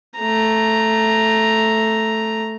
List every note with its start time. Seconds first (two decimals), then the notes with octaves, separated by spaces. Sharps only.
0.18 A3 A#5